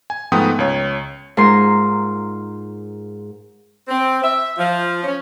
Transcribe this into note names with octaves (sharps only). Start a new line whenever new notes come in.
G#5
G#2 F3 A3 B3 G5 D#6
C#2 C#5
G#2 F4 A#4 C6
C4
E5
F3
C#4